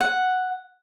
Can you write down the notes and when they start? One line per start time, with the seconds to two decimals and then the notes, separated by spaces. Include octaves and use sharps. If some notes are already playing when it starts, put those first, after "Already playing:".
0.01 F#5